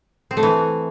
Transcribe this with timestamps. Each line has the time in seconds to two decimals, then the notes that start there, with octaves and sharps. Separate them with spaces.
0.31 C4
0.37 A3
0.43 E3